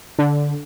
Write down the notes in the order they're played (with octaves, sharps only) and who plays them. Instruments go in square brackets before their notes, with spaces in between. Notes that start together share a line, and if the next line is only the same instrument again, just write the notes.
[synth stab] D3